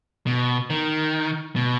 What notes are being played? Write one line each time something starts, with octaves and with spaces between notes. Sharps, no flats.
B2
D#3
B2